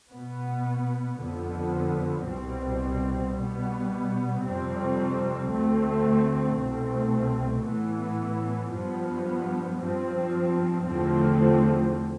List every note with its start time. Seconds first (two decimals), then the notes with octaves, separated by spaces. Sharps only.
0.13 B2 B3
1.21 F2 D3 F3 B3
2.29 C2 B2 G3 C4
3.36 B2 G3 B3
4.44 F2 C3 G3 C4
5.51 D2 D3 A3 C4
6.58 C2 B2 A3 C4
7.65 A2 E3 B3
8.73 G2 F3 B3
9.81 G2 F3 C4
10.87 E2 D3 F3 A3 C4